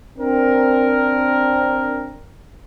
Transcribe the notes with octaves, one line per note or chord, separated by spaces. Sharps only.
C4 D4 A#4